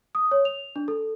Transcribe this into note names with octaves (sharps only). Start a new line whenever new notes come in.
D#6
C#5
F7
D4
A4